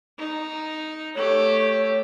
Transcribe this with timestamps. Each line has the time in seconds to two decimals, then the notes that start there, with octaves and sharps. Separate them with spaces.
0.18 D#4
1.15 A3 G4 C#5